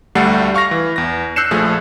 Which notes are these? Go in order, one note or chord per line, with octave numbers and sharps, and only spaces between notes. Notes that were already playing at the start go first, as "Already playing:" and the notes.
D2 G3 A3 A4 F#5 C7
F5 C#6 F6 A#6
E3
E2 A#6
E6 F#6 G6 C7 C#7 E7
A#1 F3 A3 G#4 F#6